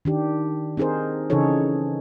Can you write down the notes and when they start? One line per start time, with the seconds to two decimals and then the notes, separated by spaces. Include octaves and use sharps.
0.05 D#3 D4 G4
0.77 C4 D#4 G#4 A#4 C5
1.30 C#3 E3 D#4 G#4 A4 C#5